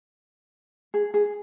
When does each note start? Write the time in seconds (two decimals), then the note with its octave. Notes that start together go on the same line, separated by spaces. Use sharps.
0.94 G#4
1.14 G#4